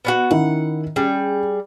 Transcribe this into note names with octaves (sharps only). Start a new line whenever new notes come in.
B3 C#4 F#4
D#3 C#4 E4 F#5
G3 C#4 G#4